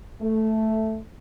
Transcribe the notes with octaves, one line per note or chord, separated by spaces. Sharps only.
A3